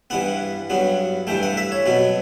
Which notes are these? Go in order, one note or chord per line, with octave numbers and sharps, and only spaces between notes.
G2 E3 B3 F#5
G2 F#3 B3
G2 E3 A3 G5
F#5
E5
C#5
B2 F#3 B3